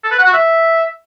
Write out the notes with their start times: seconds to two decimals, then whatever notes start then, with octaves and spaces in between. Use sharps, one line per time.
0.04 A4
0.11 B4
0.19 F#5
0.26 F#4
0.33 E5